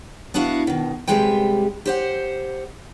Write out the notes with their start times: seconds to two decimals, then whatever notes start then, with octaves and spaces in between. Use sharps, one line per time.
0.34 B3 D4 E4 F#4 F5
0.67 B2 D#3
1.08 D2 C3 G3 G#3 B4 G5
1.86 G4 C5 F#5